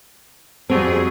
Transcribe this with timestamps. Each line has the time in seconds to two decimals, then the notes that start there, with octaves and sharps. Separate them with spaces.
0.70 F2 G3 C4 F#4 G#4 A4